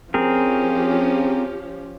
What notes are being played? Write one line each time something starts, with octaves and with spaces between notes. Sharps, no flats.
F3 C4 C#4 G4 G#4 A#4